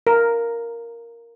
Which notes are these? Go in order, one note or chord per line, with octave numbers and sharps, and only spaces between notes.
A#4